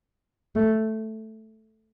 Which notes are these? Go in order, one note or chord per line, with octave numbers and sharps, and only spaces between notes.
A3